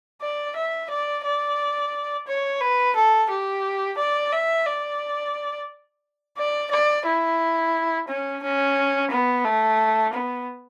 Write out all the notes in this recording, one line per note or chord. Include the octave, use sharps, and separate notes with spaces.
D5
E5
D5
D5
C#5
B4
A4
G4
D5
E5
D5
D5
D5
E4
C#4
C#4
B3
A3
B3